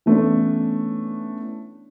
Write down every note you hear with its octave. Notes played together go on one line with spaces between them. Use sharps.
E3 A3 B3 C#4 D4